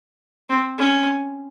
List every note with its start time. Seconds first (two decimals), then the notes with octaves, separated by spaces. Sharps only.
0.49 C4
0.78 C#4